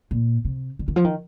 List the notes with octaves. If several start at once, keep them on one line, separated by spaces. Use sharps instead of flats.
A#2
C3
D3
D#3
F3
D#3